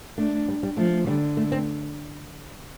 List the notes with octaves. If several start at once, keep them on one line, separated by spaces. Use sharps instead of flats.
A3 D4
G3
G3
F3 A3
D3 G3
A3
C4